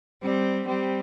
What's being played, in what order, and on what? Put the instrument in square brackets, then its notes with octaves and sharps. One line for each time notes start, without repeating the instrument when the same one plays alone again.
[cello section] G3 [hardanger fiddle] C4
[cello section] G3 [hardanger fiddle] C4